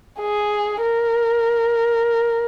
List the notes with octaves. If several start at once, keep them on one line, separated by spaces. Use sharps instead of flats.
G#4
A#4